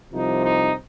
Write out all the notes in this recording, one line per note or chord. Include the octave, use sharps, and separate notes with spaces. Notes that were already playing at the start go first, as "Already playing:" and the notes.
C2 C3 F3 D#4
D#4